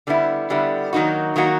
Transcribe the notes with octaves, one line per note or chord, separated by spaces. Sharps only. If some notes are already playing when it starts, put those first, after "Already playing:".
D3 G3 B3 E4
D3 G3 B3 E4
D#3 F#3 A#3 D#4 F#4
D#3 F#3 A#3 D#4 F#4